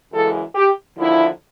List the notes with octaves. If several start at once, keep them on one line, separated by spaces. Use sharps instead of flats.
F#2 C#3 E3 G#3 A4
G4
D#2 D3 F3 E4